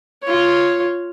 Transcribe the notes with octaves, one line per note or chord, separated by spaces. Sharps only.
F4 C#5